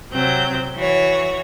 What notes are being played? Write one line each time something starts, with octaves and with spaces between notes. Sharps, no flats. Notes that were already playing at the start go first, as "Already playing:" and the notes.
C3 F#3 C4 G6
E3 F#4 C#5